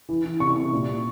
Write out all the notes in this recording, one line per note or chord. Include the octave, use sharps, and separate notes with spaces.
E3
E3
C3 C#6
C3
A#2
A#2